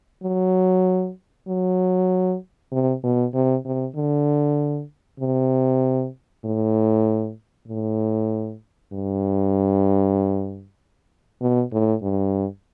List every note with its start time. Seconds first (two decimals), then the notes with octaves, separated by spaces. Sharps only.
0.23 F#3
1.48 F#3
2.72 C3
3.03 B2
3.34 C3
3.65 C3
3.96 D3
5.20 C3
6.45 A2
7.68 A2
8.93 G2
11.41 B2
11.72 A2
12.02 G2